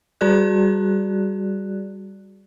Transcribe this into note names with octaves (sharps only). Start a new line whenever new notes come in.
G3 F#4 G#4 D5 F#6